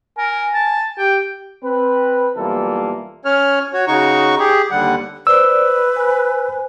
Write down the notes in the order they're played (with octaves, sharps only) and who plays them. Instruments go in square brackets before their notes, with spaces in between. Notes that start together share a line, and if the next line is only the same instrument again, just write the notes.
[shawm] A#4 [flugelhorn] G#5
[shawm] A5
[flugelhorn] G4 [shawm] G5
[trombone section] C4 B4
B1 E3 G3 A#3 F4 A4
[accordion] C#4 C#5 F6
F#4 C#5
C#3 D#4 F#4 C#6
G4 G#4
D#2 D3 G3 F#5
[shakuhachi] B4 [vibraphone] C5 D5 [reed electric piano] E6
[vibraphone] C5 G#5